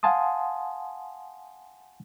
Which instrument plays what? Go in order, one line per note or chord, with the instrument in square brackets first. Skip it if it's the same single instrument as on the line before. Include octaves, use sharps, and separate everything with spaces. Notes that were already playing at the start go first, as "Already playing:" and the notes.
[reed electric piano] F5 F#5 G#5 A5 C6 D#6